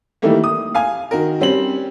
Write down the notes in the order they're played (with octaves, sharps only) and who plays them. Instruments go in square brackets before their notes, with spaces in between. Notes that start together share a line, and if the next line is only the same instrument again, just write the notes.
[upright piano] D#3 E3 G3 A3 A#3
D#6
F5 G#5
D#3 F#4 A#4
G3 C4 C#4 F#7